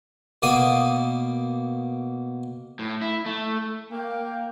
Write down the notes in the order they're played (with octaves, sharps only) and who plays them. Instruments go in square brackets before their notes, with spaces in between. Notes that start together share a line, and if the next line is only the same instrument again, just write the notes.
[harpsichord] B2 A#3 D5 D#6
[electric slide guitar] A2
E4
A3
[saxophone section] A#3 [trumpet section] G5